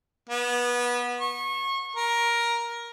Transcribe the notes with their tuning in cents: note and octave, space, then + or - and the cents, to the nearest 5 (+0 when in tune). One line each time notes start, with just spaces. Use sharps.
B3 -20
C#6 -30
A#4 +10